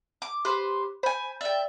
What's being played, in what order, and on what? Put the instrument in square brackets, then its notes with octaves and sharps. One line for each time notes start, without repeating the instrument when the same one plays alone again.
[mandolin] D6
[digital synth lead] G4 [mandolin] B4 C5
[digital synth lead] C5 [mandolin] G#5 B5
[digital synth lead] D5 [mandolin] E5 G5